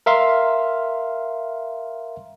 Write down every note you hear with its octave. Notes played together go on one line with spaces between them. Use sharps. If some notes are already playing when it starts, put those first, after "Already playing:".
A#4 E5 F5 C6